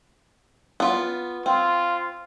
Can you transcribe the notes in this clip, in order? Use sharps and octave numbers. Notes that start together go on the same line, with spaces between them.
B3 F4
C4 F4